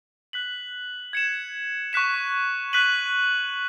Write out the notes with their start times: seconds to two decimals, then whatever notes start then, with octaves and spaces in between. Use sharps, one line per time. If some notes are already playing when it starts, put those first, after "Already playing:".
0.33 F#6 B6 F#7
1.13 G#6 C#7 E7
1.93 C#6 F#6 B6 E7
2.73 F#6 B6 D#7 F#7